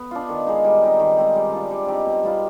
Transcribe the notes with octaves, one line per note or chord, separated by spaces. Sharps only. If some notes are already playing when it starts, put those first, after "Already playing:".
Already playing: B3
D4 F4
D#3
G#3 B3 D#4
G3
C4 D#4 G4
D#3
G#3 C4 G4
G3
D4 F4
G3
C4 D#4 G4
B2
G3 B3 F4